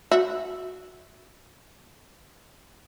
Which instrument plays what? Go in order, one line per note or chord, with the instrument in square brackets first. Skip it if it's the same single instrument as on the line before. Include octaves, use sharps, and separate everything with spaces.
[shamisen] F#4 E5